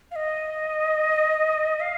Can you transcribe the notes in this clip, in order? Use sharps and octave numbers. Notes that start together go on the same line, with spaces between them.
F5
D#5
F5